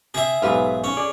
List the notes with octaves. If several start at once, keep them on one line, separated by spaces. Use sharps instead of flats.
C3 G#4 E5
B1 G#2 G4 B4 F5
C#4
G#4 D5